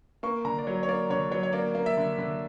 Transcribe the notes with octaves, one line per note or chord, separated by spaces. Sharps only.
A#3 C#6
D3 A#5
D5
F#3 C#5
C#5
A#3 D5
D3 C#5
F#3 C#5
C#5
A#3 D5
A#3
E5
D3
D3